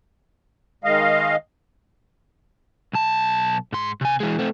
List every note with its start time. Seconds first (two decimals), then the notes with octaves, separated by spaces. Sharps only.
0.84 D#3 G#3 D#5 F5
2.93 B1 A5
3.73 G#2 C6
4.01 C3 G#5
4.20 E3 G#3
4.39 A3 C4